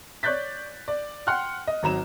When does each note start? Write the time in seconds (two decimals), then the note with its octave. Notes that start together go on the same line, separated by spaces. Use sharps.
0.23 C#5 D5 F#6 G6 A6 B6
0.88 D5
1.27 F#5 G5 C6 F6 F#6
1.67 D#5
1.83 G#1 F#3 A#5 E7